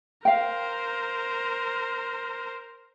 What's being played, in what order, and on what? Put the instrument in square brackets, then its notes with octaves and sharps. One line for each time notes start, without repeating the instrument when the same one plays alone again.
[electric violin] A#4 C5 [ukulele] F5 G5